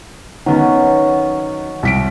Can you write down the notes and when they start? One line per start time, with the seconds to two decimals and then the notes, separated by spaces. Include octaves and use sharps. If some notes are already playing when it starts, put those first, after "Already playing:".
0.46 D#3 F#3 B3 C#4
1.83 C2 B6 D7